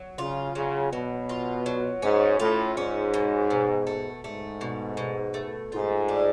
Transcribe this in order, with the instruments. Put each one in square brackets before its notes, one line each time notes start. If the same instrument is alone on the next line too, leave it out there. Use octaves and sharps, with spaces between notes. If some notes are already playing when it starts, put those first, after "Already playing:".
Already playing: [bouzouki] F#3
[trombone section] C#3 [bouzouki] F4
[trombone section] C#3 [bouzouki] F#3
[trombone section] B2 [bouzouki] F#3
[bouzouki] F4
F#3
[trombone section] G#2 [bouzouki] C#4
[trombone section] A2 [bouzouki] F4
[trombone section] G#2 [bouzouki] C#4
[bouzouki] B2
B2
A3
[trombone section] G#2 [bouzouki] A3
[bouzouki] B2
B2
A3
[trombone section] G#2 [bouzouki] F4
[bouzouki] D4